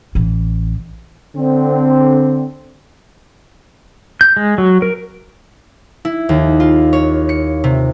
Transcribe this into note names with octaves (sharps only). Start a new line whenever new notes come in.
A1 E3
D3 C4
G6
G#3
F#3
A#4
E4
D#2
F4
C#5
C#7
C3